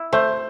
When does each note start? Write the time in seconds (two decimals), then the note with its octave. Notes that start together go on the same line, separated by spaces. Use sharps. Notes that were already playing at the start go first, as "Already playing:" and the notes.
Already playing: E4
0.13 A3 C5